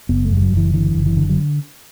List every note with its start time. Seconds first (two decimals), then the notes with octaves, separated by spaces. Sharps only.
0.09 F#1 B3
0.25 A3
0.31 F#2
0.37 G3
0.42 F#3
0.52 F#1 E3
0.74 D3 E3
0.95 F#1
1.06 E3
1.17 D3
1.30 F#3